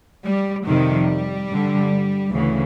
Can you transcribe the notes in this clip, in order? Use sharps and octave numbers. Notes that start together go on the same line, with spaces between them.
G3
F2 C3 D#3 G3
G2 D3
D2 C#3 E3